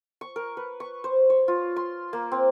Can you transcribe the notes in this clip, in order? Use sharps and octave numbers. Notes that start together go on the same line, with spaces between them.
C#6
A#4
B4
C#6
C5
C#5
F4
C6
A#3
C4